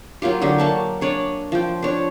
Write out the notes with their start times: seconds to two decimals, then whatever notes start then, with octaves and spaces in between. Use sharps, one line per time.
0.22 F#3 A#3 F4 G4
0.41 D3 F#3 G4
0.58 A#3 A5 C#6
1.01 D4 C#5 D5 G#5
1.52 F3 G5
1.83 D4 C#5